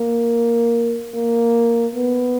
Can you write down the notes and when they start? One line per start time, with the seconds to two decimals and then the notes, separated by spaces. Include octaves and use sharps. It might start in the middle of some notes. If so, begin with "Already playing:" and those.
Already playing: A#3
1.14 A#3
1.95 B3